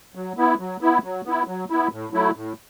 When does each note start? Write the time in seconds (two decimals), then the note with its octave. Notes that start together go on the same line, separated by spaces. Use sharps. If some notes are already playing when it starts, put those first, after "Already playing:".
0.15 F#3
0.37 B3 E4
0.59 F#3
0.81 B3 E4
1.04 F#3
1.25 B3 E4
1.47 F#3
1.70 B3 E4
1.91 A2
2.13 F#3 A3 E4
2.35 A2